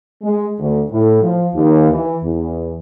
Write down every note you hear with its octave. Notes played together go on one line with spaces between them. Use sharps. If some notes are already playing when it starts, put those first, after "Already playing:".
G#3
D2
A2
F3
D#2
E3
E2